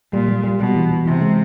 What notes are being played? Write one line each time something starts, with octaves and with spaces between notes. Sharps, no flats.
A#2 G3
G3
G3
B2 G3
E3
E3
C3 E3
G#3